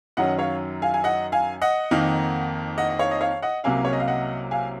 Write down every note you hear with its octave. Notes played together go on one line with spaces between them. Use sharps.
F#2 D#3 F#3 C#4 D#5 F#5
C#5 F5
F5 G#5
G#5
D#5 F#5
F5 G#5
D#5 F#5
F2 D#3 A#3 D#4
D#5 F#5
D#5
C#5 F5
D#5
C#5 F5
D#5 F#5
C2 C3 F#3 A#3 C#4 F5 G#5
C#5
D#5
F5
D#5 F#5
F5 G#5